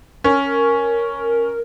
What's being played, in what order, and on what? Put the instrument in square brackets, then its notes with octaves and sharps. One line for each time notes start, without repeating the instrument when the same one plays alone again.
[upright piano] C#4 [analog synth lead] A#4